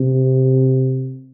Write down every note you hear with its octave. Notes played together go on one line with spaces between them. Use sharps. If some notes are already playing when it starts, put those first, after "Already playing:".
Already playing: C3